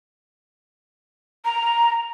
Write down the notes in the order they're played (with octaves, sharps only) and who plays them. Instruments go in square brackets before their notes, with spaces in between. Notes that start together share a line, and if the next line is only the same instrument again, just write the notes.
[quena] A#5